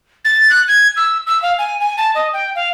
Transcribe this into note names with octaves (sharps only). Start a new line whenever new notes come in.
A6
F#6
G#6
E6
E6
F5
G#5
G#5
A5
D#5
G5
F5